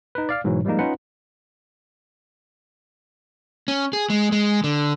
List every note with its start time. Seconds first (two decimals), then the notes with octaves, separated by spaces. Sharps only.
0.15 D#4 B4
0.29 D5 F5 F6
0.44 G#2 B2 E3 F#3
0.65 F3 G3 G#3 A#3 D#4
0.79 C#4 D#4 F4 B4 F#5
3.68 C#4
3.93 G#4
4.10 G#3
4.32 G#3
4.64 D3